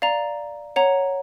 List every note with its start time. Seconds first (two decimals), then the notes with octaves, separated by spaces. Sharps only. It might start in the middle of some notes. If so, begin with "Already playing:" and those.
0.02 D5 F5 A#5
0.76 C#5 F#5 A#5